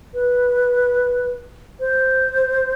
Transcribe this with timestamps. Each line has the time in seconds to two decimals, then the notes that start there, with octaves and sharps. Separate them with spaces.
0.14 B4
1.80 C5